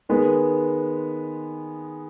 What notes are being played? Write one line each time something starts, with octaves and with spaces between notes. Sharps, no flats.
D#3 G#3 B3